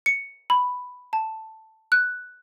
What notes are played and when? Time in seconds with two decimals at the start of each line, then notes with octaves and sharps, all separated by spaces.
0.06 C#7
0.50 B5
1.13 A5
1.92 F#6